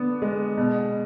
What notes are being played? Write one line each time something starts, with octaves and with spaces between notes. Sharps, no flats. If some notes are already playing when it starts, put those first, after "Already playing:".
Already playing: D3 B3 D4
G#3
B2